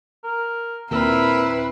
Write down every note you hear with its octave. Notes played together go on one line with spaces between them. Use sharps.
A#4
D#2 A#2 C4 E4 A#4 B4 E6